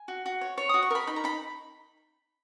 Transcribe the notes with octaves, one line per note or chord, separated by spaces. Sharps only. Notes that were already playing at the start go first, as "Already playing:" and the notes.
Already playing: G#5
F#4
F#4
C#5
C#5 C#6
F#4 D#6
C#6
A#4 B5
D#4 B5
A#5
D#4 B5